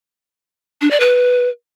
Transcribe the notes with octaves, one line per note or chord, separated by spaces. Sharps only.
D4
D5
B4